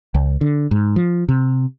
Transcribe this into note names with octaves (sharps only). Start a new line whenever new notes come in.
C#2
D3
G#2
F3
C3